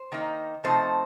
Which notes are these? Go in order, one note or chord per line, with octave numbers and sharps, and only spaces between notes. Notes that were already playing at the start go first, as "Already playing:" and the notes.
Already playing: C5
D#3 A#3 D#4
C3 F3 A3 C4 D#4 C5